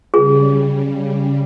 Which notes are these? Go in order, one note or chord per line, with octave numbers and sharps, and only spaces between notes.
C#3 G3 G#4